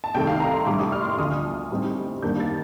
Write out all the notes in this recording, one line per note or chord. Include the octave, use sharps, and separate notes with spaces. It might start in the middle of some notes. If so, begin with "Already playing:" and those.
A5
C2 C3 D#3 A3 G5
F5
A#5
C6
A2 G3 D4 D6
D#6
F6
C6
D6
D2 D3 F3 D#6
A2 G3 C4 D#4
D#2 D#3 G3 A#3 D4 G6
A6